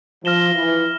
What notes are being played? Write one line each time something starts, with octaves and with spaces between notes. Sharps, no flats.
F3 F6 A#6 E7 G7
E3